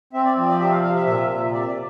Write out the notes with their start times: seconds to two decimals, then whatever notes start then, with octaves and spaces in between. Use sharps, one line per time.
0.13 C4 E5
0.25 D5
0.37 F3
0.48 D5
0.59 C3 E5
0.72 F5
0.83 C3 F5
0.95 E5
1.05 A#2 E5
1.28 A#2
1.52 C3 D5
1.61 E5
1.67 D5